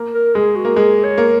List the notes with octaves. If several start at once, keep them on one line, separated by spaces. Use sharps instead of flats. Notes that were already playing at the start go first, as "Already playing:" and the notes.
Already playing: A#3
A#4
G#3 G#4
F#4
A#3
G#3 G#4
C#5
A#3